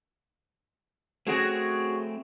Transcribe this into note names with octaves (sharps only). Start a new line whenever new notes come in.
A3 C4 F#4 G#4 C#5